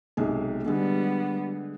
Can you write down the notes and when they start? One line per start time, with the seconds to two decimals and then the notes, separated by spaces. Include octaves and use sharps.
0.17 B1 C3 G#3
0.66 D3 G3 G#3 B3